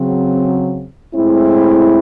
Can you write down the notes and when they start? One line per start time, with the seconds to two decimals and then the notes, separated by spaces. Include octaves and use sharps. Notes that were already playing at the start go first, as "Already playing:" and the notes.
Already playing: C#3 F#3 C4
1.15 A2 G#3 C4 E4